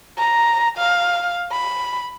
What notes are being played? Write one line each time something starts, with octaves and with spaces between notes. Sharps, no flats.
A#5
F5
B5